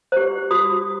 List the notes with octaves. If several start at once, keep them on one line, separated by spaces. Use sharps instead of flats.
G4 C5
F#4 D#6